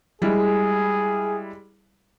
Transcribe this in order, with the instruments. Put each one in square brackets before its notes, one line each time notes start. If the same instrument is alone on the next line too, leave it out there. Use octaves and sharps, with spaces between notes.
[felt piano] G3 G#3 E4 [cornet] G#4